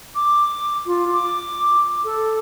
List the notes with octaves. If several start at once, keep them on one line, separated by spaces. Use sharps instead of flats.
D6
F4
D6
A4